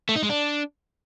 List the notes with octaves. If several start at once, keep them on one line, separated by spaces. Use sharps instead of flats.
A3
D#4
G#3
D4